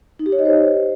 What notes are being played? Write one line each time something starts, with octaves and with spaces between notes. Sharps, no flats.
D#4
G4
C#5
D#5
C5